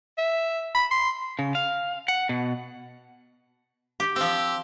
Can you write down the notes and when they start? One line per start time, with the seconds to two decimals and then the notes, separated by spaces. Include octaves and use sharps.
0.18 E5
0.75 B5
0.91 C6
1.39 C#3
1.55 F5
2.08 F#5
2.29 B2
4.00 G4
4.16 F3 C4 G4 E6